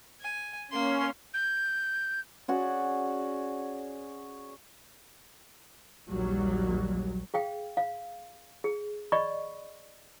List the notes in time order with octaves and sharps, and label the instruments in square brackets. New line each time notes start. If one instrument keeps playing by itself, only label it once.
[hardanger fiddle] G#5
[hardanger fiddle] A#3 C6 [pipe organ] C#4
[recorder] G6
[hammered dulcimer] C#4 F#4 G#4 D5
[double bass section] A#1 D#2 F#3 G3
[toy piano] G#4 F5 G5
F5
G#4
D5 D#5 B5 C#6